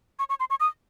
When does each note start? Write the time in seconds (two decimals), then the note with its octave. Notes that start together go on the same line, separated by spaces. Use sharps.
0.19 C#6
0.29 C#6
0.40 C6
0.50 C#6
0.60 D#6